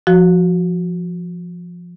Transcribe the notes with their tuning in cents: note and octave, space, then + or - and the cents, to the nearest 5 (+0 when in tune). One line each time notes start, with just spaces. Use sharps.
F3 +0 F#4 +0